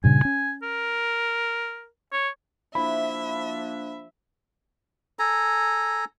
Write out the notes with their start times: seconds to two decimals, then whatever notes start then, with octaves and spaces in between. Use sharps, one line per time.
0.04 G2 A#2 C#3 G#5
0.25 C#4
0.62 A#4
2.12 C#5
2.75 F3 A#3 D4 E4 E5 B5
5.19 A4 G#5 A#5